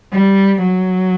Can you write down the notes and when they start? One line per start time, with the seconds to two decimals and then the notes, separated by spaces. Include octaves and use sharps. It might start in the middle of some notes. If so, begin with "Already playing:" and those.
0.13 G3
0.62 F#3